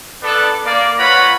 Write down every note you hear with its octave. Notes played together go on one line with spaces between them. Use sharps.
B3 D4 A4
A#3 D5
F4 B4 C#5 F#5 A#5 B5